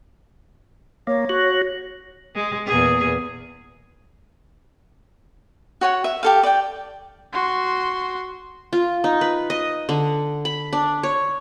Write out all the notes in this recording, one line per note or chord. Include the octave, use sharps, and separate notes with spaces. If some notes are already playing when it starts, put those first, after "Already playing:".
A#3 C#5
F#4
G#3
E2 A#2 G#4
F#4 C#5 F#5
E5
G4 A4 F5
D5 G5
F#4 C6
F4
D#4
B4
D#5
D3
B5
D4
C#5